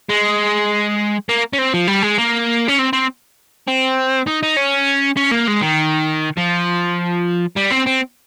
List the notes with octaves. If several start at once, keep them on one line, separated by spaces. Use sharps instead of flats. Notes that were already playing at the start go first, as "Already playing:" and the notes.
G#3
A#3
C#4
C4
F3
G3
G#3
A#3
C#4
C4
C4
C4
D#4
D#4
C#4
C#4
A#3
G#3
D#3
F3
G3
C4
C4